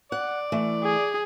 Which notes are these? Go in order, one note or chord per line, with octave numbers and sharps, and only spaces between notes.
D5 F#5
E3 A3
G#4